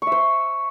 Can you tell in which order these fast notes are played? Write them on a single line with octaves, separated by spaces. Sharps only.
C#6 E5 C5